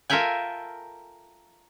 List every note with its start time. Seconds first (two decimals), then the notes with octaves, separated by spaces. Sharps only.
0.10 F4 A4 A#4 E5 G5 G#5